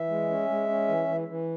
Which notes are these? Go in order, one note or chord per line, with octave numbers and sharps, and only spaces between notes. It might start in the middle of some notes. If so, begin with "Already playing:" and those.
Already playing: E3 E5
G#3
C#4
G#3
C#4
E3
E3
E3